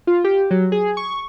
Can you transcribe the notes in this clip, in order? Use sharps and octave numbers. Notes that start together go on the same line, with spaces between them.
F4
G4
F#3
G#4
C#6